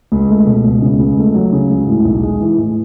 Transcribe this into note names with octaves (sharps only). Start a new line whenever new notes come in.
C#2
A3
B2
C#2
C#3
C#2
A3
F#3
C#3
C#2
A2
B1
G#3
E3
A2